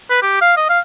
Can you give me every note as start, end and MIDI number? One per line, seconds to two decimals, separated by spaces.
0.10 0.21 71
0.22 0.38 67
0.41 0.54 77
0.57 0.67 75
0.69 0.80 77